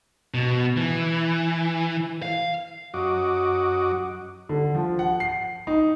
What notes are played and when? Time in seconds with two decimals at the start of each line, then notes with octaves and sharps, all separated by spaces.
0.34 B2
0.77 E3
2.22 F5
2.94 F#2 F#4 D#5 D6
4.49 D3
4.75 F3
4.99 F#5
5.20 C7
5.67 D#4